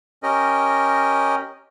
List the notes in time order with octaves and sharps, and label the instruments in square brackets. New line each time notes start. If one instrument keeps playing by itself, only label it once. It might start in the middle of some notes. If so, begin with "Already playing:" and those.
[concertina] C#4 G4 A#4 D#5